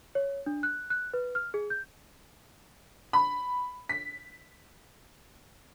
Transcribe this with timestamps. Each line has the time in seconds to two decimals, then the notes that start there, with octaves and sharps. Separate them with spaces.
0.15 C#5
0.46 D4
0.63 F#6
0.90 F#6
1.14 B4
1.35 F6
1.54 G#4
1.70 G6
3.13 B5
3.89 B6